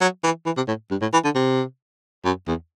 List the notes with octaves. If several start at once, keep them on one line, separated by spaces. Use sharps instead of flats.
F#3
E3
E3
C3
A2
G2
A2
E3
D3
C3
F#2
E2